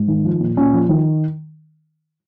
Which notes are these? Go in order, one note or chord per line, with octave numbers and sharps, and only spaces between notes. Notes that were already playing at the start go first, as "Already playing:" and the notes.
Already playing: G#2
D#3
F3
A#2
A#2 C#4
F3
D#3